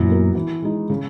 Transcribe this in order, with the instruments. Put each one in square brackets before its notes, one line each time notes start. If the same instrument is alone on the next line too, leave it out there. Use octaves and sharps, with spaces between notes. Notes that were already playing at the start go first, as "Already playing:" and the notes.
Already playing: [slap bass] F#2 A#2 [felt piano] E3
[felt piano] B3 F#4 A#4
E3
G#3 D#4
C#3